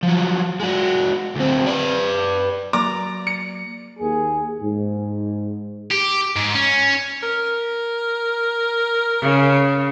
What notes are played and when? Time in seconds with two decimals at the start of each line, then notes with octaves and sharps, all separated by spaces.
0.03 F3 F#3
0.60 G#3 F#4
1.35 D2 C4
1.66 B4 D5
2.73 F#3 A#3 D5 A#5 D6
3.27 C#7
4.00 D#2 A#3 G#4
4.61 G#2
5.91 G4
6.36 G#2
6.55 C#4
7.23 A#4
9.20 C#3